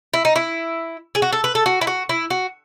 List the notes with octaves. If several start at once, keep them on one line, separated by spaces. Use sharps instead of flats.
E4
D#4
E4
G#4
F#4
A4
B4
A4
F#4
E4
F#4
E4
F#4